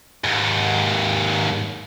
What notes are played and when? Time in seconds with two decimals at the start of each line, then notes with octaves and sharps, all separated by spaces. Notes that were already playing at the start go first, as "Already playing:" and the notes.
0.24 D#2 G#2